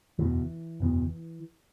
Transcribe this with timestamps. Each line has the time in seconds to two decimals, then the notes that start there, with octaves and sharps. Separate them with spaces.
0.19 F#1 E2 B2 E3
0.80 F#1 E2 B2